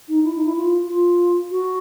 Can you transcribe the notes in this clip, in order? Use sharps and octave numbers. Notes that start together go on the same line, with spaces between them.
D#4
E4
D#4
E4
F4
F4
F#4